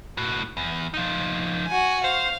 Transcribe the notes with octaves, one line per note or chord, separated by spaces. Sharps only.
A2 F#4
E2
F3 D#4
F#4 G#5
C5 F5